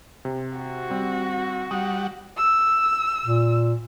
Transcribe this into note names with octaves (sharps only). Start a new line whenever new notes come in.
C3
F#4
G3 C4
G3 F#5 D#6
E6
A#2